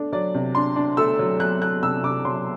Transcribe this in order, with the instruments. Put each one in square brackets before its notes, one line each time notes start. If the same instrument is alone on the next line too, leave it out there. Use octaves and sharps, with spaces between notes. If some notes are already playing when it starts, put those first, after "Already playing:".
Already playing: [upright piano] A3 D4
F#3 D5
C3
D4 C6
D4
A3 E6
F#3
F#3 F#6
A3 F#6
C3 E6
C3 D6
F#3 C6